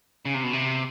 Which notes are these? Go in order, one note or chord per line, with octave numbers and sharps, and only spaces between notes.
C#3
C3
B2
C3